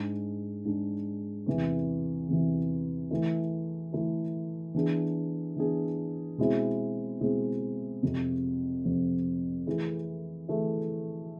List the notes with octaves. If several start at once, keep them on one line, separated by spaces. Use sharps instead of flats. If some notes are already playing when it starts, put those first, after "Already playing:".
Already playing: G#2 G#3 D4
G#2 G#3 D4
E2 C3 E3
E2 C3 E3
E3 A3 E4 A4
E3 A3 E4 A4
E3 B3 D4 G#4
E3 B3 D4 G#4
B2 G#3 C4 E4 G#4
B2 G#3 C4 E4 G#4
F2 C3 F3
F2 C3 F3
E3 A3 E4 G#4
E3 A3 E4 G#4